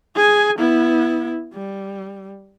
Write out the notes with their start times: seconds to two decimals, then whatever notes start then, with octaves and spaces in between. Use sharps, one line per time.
0.16 G#4 G#5
0.58 B3 E4
1.54 G3